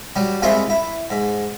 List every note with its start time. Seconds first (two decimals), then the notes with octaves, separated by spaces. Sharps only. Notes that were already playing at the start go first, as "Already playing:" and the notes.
0.16 F#3 G3
0.42 C2 C3 G#3 E4 F4 C6
0.70 E4
1.10 G#2